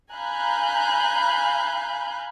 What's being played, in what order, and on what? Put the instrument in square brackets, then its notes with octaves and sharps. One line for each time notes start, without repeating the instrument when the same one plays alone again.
[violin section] F5 G#5 A#5 B5 F#6 G6